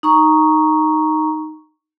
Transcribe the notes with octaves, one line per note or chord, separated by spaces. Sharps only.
D#4 A#5 C#6